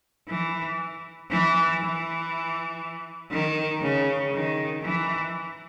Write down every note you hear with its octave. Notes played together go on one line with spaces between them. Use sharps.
E3
E3
E3
D#3
C#3
D#3
E3